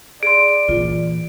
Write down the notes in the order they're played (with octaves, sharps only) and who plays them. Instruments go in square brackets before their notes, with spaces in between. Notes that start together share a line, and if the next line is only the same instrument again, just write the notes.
[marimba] G#4 C6 [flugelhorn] D5 [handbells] D7
[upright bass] A#2 E3 [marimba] F4